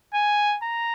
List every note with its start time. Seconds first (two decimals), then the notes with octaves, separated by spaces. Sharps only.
0.14 G#5
0.62 A#5